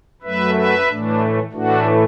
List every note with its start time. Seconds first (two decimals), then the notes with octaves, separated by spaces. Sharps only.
0.22 F#2 F#3 A3 B4 E5
0.55 B4 E5
0.87 A2 E3 A3 D4
1.52 A2 E3 A3 D4 F#4